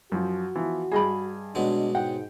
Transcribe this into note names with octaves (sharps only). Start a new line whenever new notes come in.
F#2 F3 F#4
E3 F3 B3
G2 G#4 D#5 G#5 B5
B2 F#3 G#3 D4
G#2 F#5 G5